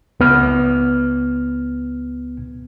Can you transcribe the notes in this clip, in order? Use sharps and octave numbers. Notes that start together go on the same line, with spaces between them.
C#2 B3 F6